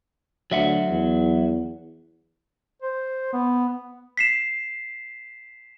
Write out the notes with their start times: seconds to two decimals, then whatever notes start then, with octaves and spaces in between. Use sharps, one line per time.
0.51 D2 F#3 E5 F#5
0.90 E2
2.82 C5
3.33 B3
4.17 B6 C7 E7